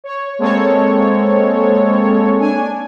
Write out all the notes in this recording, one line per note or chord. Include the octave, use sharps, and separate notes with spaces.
C#5
G#3 A#3 C4 A4 C#5
D4 G#5